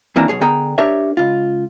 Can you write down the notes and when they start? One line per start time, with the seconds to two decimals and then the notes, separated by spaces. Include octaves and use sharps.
0.16 D#2 E3 A#3 C4 D4 A#5
0.28 B1 G#2 G#4 C#5
0.41 D3 B3 G#4 A#4 G5 A#5
0.78 D4 G4 A#4 C#5 E5
1.17 C#2 F4